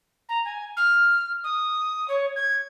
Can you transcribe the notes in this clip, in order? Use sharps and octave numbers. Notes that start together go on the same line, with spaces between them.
A#5
G#5
F6
D#6
C#5
G#6